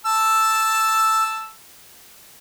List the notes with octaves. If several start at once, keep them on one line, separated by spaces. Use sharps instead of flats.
A5 E6